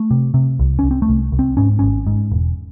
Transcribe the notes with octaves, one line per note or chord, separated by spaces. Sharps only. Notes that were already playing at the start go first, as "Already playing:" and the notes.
Already playing: A3
C3
C3
C2
C2 C#4
C4
A3
C2
C2
C4
G#2 C#4
G#1 C#4
G#2
E1